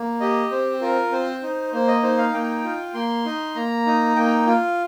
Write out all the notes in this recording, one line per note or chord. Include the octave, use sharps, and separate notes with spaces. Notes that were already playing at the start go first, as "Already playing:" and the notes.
Already playing: A#3
G4 D#5
C4 C5
F4 A#4
C4 C5
D#4
A#3 C5
D#5
D#4 C5
F5
A#3 G5
F4
A#3 C6
D#4
A#3 A#5
D#4
A#3 G5
F4